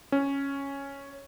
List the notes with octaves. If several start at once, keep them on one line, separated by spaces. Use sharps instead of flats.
C#4